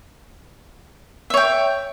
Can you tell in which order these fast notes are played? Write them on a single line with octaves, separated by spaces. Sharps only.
E5 C#5 G5